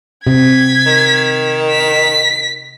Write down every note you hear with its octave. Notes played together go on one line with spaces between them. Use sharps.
C3 G#6 B6
D#3
B6